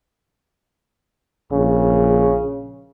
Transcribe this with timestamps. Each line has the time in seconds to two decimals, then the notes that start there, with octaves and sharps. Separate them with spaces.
1.52 A#1 C#3